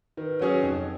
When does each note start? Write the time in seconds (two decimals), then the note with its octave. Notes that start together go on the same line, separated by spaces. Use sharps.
0.17 D#3 B4
0.40 F#3 C#4 G#4 C#5
0.63 F2 D#4